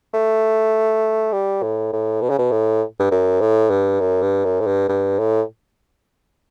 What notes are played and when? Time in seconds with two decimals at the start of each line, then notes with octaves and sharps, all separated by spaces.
0.14 A3
1.32 G3
1.63 A2
1.93 A2
2.21 B2
2.30 C#3
2.39 B2
2.51 A2
2.99 G2
3.11 F#2
3.40 A2
3.70 G2
4.00 F#2
4.22 G2
4.44 F#2
4.60 A2
4.67 G2
4.89 G2
5.19 A2